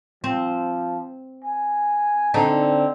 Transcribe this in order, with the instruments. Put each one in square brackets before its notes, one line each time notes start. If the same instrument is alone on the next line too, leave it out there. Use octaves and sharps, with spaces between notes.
[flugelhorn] F3 [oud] C4
[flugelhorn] G#5
[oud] D3 D4 D#4 [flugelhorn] C4